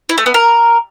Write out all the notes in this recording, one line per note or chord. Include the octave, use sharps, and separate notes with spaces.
E4
A3
B3
A#4